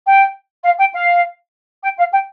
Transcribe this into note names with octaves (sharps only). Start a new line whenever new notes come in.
G5
F5
G5
F5
G5
F5
G5